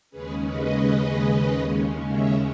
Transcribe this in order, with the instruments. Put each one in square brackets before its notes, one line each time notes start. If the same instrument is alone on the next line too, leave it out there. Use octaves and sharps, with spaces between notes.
[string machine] D#2 C#3 G#3 C#4 G#4 B4
B4 D#5
C#5 E5